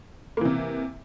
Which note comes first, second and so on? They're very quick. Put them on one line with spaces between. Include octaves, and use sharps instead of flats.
A#3 E3 C3